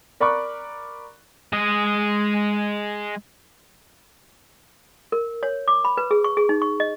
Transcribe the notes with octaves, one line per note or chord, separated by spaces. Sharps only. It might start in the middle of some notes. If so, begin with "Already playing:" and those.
A#4 D5 B5 C#6 D6 F#6
G#3 D#5
A#4
C#5
D6
B5
B4
G#4
C#6
G#4
D#4
C#6
D#5